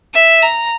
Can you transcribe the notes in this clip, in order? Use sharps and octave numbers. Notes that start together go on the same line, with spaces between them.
E5
A#5